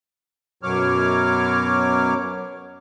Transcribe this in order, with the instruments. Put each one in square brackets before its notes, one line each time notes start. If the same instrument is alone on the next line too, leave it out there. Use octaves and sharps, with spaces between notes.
[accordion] F#2 B2 F#3 C#5 D6 F6